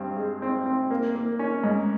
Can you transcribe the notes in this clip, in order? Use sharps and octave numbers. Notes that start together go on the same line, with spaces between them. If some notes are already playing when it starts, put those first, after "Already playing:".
Already playing: G2 C4
G#3
C4
C4
A#3
A#3
C#4
G#2